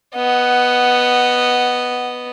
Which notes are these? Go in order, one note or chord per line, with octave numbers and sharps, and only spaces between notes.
B3 D#5 F#5